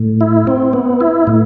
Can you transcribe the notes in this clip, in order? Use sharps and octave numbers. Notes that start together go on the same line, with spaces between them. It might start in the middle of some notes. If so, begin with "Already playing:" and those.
Already playing: A2
E4
C4
B3
E4
A2